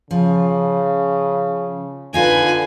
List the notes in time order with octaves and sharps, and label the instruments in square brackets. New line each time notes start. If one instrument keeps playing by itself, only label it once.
[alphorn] C#3 [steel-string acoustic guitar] F3
[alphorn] D3 [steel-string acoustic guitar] D#4 F4 [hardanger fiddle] B4 G#5